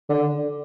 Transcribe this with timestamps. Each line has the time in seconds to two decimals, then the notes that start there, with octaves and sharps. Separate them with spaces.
0.09 D3